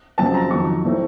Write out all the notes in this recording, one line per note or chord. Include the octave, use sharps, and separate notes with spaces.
F2 C#3 F#3 C4 A5
A#5
F2 D#3 F#3 C#6
A2 A3 C4